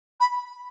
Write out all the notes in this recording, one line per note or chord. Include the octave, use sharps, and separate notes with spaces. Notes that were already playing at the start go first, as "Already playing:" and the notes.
B5